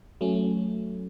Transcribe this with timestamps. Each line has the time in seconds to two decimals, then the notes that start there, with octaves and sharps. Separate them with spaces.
0.21 F#3 A3 C#4